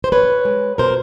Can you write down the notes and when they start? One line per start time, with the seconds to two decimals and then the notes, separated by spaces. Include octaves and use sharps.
0.04 C5
0.12 B2 B4 C#5
0.45 G#3
0.78 B2 A#4 C5